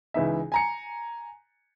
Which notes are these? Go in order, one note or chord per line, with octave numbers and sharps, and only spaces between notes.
C#2 E3 D#4 E5
G#5 A#5 C#7